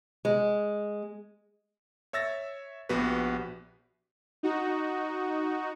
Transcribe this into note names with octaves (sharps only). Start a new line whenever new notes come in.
G#3
C#5 E5 E6 A6 A#6
A#1 B3 F#4 G4 B4
D#4 F#4